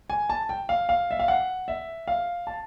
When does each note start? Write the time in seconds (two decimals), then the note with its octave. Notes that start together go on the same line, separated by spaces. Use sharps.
0.10 G#5
0.30 A5
0.49 G5
0.69 F5
0.89 F5
1.11 E5
1.19 F5
1.28 F#5
1.68 E5
2.08 F5
2.47 A5